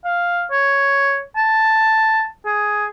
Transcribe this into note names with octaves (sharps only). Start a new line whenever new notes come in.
F5
C#5
A5
G#4